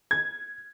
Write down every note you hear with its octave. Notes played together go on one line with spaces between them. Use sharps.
G#6